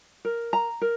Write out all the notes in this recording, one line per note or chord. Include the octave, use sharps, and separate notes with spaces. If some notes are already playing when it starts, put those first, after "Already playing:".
A#4
A#5
A#4